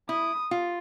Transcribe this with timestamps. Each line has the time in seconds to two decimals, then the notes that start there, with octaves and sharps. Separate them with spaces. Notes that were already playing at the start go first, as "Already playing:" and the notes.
0.09 E4 D#6
0.51 F4